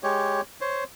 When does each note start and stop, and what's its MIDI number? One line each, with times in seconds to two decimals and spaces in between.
0.03 0.41 56
0.03 0.41 67
0.03 0.41 73
0.61 0.84 72
0.61 0.84 73